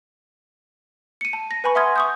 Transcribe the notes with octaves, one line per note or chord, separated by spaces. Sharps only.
C#7 D#7
A5
A#6
B4 G#5 B5 C#6
E5 F#5 C6 D#6 F6 G#6
C#6 D#6 G6